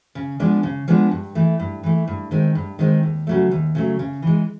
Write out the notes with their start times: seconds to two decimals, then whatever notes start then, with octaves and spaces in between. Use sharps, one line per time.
0.15 C#3
0.40 F3 G#3 B3 D4
0.63 C#3
0.88 F3 G#3 B3 D4
1.11 G2
1.35 E3 A3
1.60 G2
1.83 E3 A3
2.08 G2
2.31 D#3 G#3 C4
2.55 G2
2.79 D#3 G#3 C4
3.03 D#2
3.27 C#3 F#3 A3
3.51 D#2
3.75 C#3 F#3 A3
3.99 C#3
4.22 E3 G#3